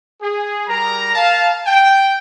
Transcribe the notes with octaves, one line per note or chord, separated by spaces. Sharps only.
G#4
G3 A#4 A#5
F5 A5
G5